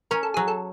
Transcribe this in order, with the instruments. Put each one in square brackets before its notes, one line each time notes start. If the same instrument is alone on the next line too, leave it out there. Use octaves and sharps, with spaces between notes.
[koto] C#4 [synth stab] A#4
[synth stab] A4
[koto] F#3 [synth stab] G#4
[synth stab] A4